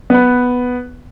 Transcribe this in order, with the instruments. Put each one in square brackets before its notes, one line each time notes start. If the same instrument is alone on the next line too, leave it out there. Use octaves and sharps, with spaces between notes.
[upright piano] B3 B4